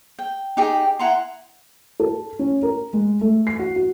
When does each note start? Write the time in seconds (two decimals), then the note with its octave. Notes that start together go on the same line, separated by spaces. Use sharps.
0.19 G5
0.57 D#4 G4 G#4
0.99 E4 F#5 A#5 C6
2.00 A4
2.39 C#4
2.63 A#4
2.93 G#3
3.21 A3
3.47 C7
3.59 F#4
3.76 F#4